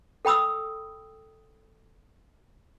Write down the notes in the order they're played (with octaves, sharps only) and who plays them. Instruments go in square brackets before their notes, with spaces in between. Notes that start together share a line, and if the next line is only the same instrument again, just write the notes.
[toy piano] A4 G5 B5 D#6 E6